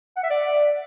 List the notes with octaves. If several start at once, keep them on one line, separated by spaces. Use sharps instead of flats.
F#5
E5
D5